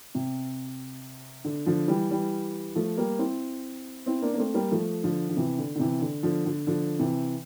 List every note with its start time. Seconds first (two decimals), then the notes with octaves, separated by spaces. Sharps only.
0.15 C3
1.45 D3
1.66 D3 F3
1.88 E3 G3
2.10 E3 G3
2.75 F3 A3
2.97 G3 A#3
3.19 C4 E4
4.06 C4 E4
4.22 A#3 D4
4.34 A#3
4.38 A3 C4
4.54 G3 A#3
4.71 F3 A3
5.04 D3 F3
5.29 D3
5.36 C3 E3
5.58 D3
5.75 D3
5.80 C3 E3
6.01 D3
6.23 D3 F3
6.46 D3
6.67 D3 F3
6.99 C3 E3